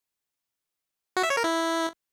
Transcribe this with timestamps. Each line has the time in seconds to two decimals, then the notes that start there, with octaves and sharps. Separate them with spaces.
1.17 F#4
1.23 E5
1.30 C#5
1.37 A#4
1.44 E4